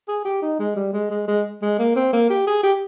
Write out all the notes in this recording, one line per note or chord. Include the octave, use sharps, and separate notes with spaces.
G#4
G4
D#4
G#3
G3
G#3
G#3
G#3
G#3
A#3
C4
A#3
G4
G#4
G4